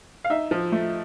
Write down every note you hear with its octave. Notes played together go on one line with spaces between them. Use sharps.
F5
D#4 E5
F3
A3